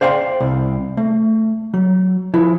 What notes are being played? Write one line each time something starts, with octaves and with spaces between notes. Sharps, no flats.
C5 D5 F5 G5 A5 C6
C2
A3
F#3
F3 E4